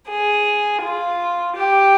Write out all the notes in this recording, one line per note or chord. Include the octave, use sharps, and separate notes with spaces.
G#4
F4
G4